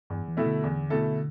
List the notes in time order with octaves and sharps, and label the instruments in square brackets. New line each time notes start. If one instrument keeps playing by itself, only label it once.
[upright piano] E2 [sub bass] G2
[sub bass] E3
[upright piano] B2 A3 E4 A4
[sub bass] D3
[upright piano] E2
B2 A3 E4 A4